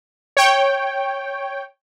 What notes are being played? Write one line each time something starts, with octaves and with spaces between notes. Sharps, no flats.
C#5 G5